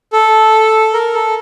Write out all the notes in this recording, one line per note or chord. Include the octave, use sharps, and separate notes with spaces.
A4
A#4
A4